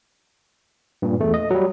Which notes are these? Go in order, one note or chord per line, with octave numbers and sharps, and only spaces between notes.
G2 A#2
E2 A3
D#5
F#3 G3